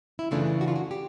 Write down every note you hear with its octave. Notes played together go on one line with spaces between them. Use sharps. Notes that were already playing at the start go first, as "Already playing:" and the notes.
E4
F#2 C#3 E3 A3 D4 F4
F#4
F4
F#4
G4